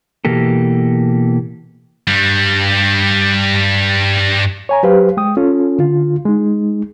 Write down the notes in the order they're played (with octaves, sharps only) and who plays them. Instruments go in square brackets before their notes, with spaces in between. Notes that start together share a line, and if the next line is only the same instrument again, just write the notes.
[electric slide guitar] B2 E3 A#3 G4 A4
[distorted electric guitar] G2 G3
[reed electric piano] C#5 G#5 A#5
F#3 G4 B4 C5 F5
G#3 G5 D#6
C#4 F4 A4
D3 F4
G#3 D#4